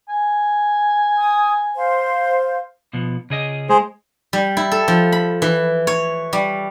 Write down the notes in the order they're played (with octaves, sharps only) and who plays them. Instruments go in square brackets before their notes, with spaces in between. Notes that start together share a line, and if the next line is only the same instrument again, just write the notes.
[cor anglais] G#5
[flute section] D#6
C5 F5
[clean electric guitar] B2 F3 B3
C#3 G#4 D#5
[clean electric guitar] G#3 [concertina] G#4 C5
[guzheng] G3
E4
A4
F3
B5
E3
C#5
G3